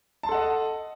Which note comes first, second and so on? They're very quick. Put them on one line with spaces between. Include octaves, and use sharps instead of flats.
A5 C6 A4 F#5 D#5